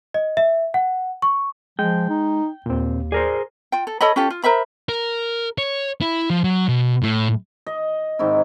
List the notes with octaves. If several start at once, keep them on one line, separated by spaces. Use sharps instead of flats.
D#5
E5
F#5
C#6
F3 G#3 G5
D#4
D#2 A#2 C4
G#4 A#4 C5 D5
F4 G5
A4
A4 C#5 D#5 B5
C#4 F4 G4 A4
F4
A#4 C5 E5 B5
A#4
C#5
E4
F3
F#3
B2
A2
D#5
G#2 D#3 C4 E4